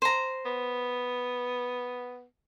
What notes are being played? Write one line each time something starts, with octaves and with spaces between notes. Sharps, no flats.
C5 A#5
B3